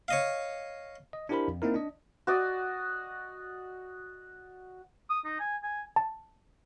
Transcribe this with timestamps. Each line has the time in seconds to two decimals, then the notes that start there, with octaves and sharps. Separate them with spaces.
0.08 C#5 D#5 F5
1.13 D#5
1.29 D4 E4 G4 A#4 C5 B5
1.48 F2
1.62 A#3 C4 D#4 E4 A#4
1.74 D4 D#5
2.27 F#4 D5 D#5
5.10 D#6
5.25 D#4
5.39 G#5
5.63 G#5
5.96 A5